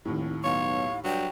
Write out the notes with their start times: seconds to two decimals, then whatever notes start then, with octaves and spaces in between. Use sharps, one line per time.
0.05 F1 D#2 A2
0.44 B1 C#5 F5
1.05 G2 F#3 G5